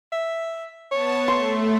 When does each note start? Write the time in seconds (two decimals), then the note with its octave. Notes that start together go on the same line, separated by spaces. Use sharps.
0.12 E5
0.92 B3 C#5 A5
1.28 A3 C6